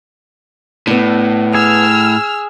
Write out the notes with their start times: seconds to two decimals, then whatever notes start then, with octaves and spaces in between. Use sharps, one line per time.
0.87 A2 B3 D4
1.55 G#4 E6 F6